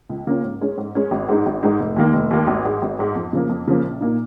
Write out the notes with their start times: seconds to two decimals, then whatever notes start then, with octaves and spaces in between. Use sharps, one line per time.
0.09 C#2
0.27 C#3 A#3 C#4 F4
0.44 G#2
0.61 G#3 C#4
0.78 G#2
0.95 G#3 C#4
1.11 G#1
1.29 G#2 G#3 D#4
1.46 G#1
1.63 G#2 G#3 D#4
1.80 F1
1.96 D#2 D#3 A#3
2.13 F1
2.31 D#2 D#3 A#3
2.47 G#1
2.65 G#2 G#3
2.82 G#1
2.99 G#2 G#3
3.15 F2
3.33 C#3 F3 A#3
3.49 F2
3.68 C#3 F3 A#3
3.83 A#1
4.00 A#2 A#3 D#4